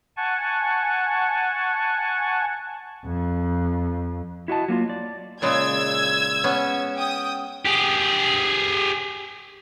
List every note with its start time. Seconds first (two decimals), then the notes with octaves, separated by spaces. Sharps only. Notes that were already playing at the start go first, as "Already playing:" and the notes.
0.17 F#5 G#5 A5 C#6
3.05 F2
4.48 E4 F#4 D#5 A5
4.68 F#3 A#3 E4 F4
4.89 D5
5.42 A#2 C#3 G#3 E6 G#6
6.44 B3 C#4
6.97 G5 D#6
7.66 G4 G#4